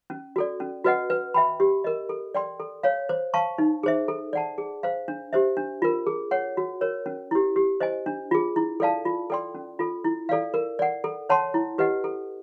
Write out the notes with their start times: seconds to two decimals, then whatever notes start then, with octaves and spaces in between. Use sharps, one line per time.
0.10 C#4
0.36 F#4 A4 D5
0.60 C#4
0.84 F#4 B4 D#5 F#5
1.10 B4
1.34 E5 G5 B5
1.60 G4
1.84 A#4 D#5
2.09 A4
2.35 D5 G5 C6
2.60 A4
2.83 C#5 F5
3.09 C5
3.34 F5 A5 C#6
3.58 D#4
3.83 G#4 C5 E5
4.08 A4
4.33 D5 F#5 A5
4.58 G#4
4.83 C5 F5
5.08 D4
5.33 G4 C5 E5
5.57 D4
5.82 F4 A#4
6.07 G#4
6.31 C#5 F#5
6.57 F#4
6.81 A#4 C#5
7.06 C#4
7.31 E4 G4
7.56 G4
7.80 C5 D#5 G#5
8.06 D4
8.31 F4 G#4
8.56 E4
8.80 A4 D5 F5 A5
9.05 F4
9.30 A4 D5 G5 C6
9.55 C#4
9.79 F4 A4
10.04 E4
10.29 A4 D5 F5
10.54 A#4
10.79 D5 F#5
11.04 A4
11.29 C#5 F#5 A5 C6
11.54 E4
11.78 G4 B4 D#5 F#5
12.04 A4